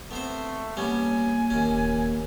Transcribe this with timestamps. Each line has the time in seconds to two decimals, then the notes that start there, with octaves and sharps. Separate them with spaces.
0.11 A3 B3 C4 C5
0.77 G3 A#3 B3 C#4 G#5
1.50 D#1 D#2 C#4